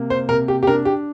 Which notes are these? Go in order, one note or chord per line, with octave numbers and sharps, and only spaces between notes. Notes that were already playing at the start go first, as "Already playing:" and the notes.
Already playing: C3 A#3
C5
C3 A#4
G4
G4
D4 A#4
G4